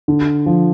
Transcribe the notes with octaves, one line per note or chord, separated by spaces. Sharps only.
D3
F3